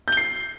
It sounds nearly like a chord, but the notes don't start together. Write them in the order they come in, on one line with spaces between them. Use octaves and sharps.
G6 G7 C7